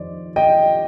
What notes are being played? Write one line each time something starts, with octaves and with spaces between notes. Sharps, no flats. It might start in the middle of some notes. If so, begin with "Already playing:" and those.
Already playing: F2 D#3 C5 D5 D#5
D#5 G5